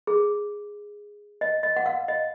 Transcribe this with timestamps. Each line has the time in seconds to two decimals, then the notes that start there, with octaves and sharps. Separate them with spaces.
0.07 G#4
1.41 D#5
1.63 D#5
1.76 F#5
1.86 F5
2.08 D#5